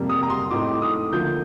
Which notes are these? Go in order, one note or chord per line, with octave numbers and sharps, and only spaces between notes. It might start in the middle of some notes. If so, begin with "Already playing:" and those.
Already playing: F2 C3 G3 A#3
D#6
A#5
C6
A2 A3 C4 D#4 D6
D#6
D2 D3 F3 A#3 G6